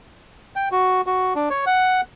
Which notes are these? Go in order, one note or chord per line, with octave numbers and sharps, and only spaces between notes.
G5
F#4
F#4
D4
C#5
F#5